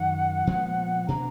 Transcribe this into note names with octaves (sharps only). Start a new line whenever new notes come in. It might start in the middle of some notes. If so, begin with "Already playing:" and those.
Already playing: F#2 D#3 F#3 F#5
A#2 F3 G#3 B3
B2 A#3 D4 A#5